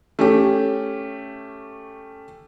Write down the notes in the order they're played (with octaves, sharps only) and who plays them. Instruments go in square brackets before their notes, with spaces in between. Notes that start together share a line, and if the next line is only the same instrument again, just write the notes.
[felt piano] A3 C#4 G4